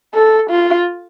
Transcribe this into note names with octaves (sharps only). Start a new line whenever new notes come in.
A4
F4